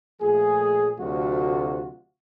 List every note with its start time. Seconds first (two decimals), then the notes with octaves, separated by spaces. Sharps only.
0.21 A#2 F3 A3 G#4
0.98 D2 C3 F#3 A3 F4 F#4